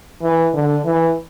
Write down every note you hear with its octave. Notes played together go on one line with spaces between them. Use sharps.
E3
D3
E3